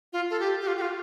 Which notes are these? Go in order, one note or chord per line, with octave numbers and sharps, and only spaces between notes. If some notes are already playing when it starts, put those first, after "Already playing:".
F4
A4
G4
G4
F4
G4
F4